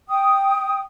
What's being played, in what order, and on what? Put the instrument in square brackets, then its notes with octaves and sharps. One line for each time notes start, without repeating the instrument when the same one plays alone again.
[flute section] G5 D#6